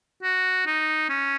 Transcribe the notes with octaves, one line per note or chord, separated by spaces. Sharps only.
F#4
D#4
C#4